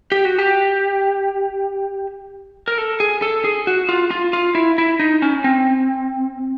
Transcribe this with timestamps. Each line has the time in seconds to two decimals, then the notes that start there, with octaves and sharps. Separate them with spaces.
0.12 G4
0.25 F#4
0.39 G4
2.68 A#4
2.78 A4
3.00 G#4
3.22 A4
3.44 G#4
3.67 F#4
3.89 F4
4.11 F4
4.33 F4
4.55 E4
4.78 E4
5.00 D#4
5.22 C#4
5.44 C4